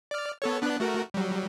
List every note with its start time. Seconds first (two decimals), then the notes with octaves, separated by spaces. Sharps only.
0.11 D5 F6
0.42 B3 A4 C#5
0.62 B3 D4 F#6
0.80 A3 F#4 A#4
1.14 F#3 G3